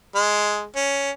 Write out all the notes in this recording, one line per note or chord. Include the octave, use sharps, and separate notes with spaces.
G#3
C#4